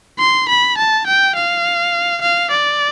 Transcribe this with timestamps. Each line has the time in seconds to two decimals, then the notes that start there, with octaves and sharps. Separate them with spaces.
0.19 C6
0.49 B5
0.78 A5
1.07 G5
1.35 F5
2.22 F5
2.51 D5